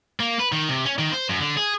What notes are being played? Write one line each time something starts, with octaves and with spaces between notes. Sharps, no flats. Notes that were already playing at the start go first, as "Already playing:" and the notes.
A#3
B4
D#3
C3
C#4
D#3
C5
F#2
D3
G#4